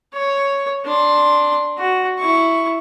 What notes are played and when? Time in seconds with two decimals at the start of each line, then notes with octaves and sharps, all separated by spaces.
0.14 C#5
0.85 D4 C6
1.78 F#4
2.19 E4 C#6